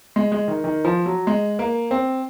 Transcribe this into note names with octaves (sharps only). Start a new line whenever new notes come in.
G#3
G#3
D#3
D#3
F3
F#3
G#3
A#3
C4